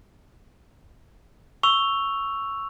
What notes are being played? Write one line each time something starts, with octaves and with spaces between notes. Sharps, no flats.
C#6 E6 F7